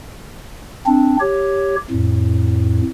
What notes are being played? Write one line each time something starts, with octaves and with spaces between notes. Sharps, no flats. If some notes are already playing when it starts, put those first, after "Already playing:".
C4 D4
G4 C#5
F2 A2